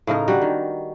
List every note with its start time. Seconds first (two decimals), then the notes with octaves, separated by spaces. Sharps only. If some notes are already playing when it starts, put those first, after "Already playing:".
0.07 A2 C#3 D#4 A#4
0.28 D3 G3 F#4
0.42 D#3